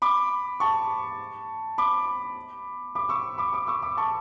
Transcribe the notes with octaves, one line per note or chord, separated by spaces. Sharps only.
B5 D6
A5 C#6
B5 D6
B5 D6
C#6 E6
B5 D6
B5 D6
C#6 E6
B5 D6
A5 C#6